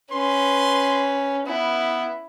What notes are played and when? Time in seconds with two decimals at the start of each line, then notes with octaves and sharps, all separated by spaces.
0.12 C#4 B4 C6
1.46 B3 E4